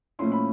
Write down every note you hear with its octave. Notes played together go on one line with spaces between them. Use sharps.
A#2 F3 A3 C#4 E4 C6
B5